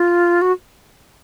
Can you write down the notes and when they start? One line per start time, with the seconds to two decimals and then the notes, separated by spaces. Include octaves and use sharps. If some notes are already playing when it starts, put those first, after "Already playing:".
Already playing: F4
0.42 F#4